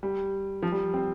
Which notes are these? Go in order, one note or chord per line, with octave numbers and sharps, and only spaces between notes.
G3
F3
G3
C4